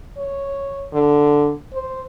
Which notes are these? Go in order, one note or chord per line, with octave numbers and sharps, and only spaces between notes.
C#5
D3
C5